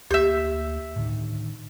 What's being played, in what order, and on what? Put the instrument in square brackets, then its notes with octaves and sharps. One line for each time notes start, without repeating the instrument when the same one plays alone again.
[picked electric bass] D2 A#3 [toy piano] G4 [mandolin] E5 G6
[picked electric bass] A2 D3 D#3